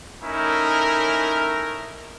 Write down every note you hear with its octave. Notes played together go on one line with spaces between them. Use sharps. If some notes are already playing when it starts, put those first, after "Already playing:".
A3 C#4 D#4 E4 A#4